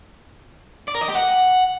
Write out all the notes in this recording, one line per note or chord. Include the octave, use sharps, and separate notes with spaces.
D5
A#4
D#5
G4
F#5